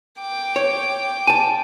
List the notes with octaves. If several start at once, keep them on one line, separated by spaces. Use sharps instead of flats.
G5 D6
C#5
G#5 A5